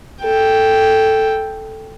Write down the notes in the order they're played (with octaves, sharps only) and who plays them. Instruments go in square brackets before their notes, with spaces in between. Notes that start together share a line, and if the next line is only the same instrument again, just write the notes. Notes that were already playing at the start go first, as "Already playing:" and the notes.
[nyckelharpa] A4 G5